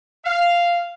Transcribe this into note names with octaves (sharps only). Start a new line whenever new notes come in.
F5